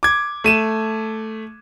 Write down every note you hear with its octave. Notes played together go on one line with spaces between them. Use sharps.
D6 G#6
A3 D#7 E7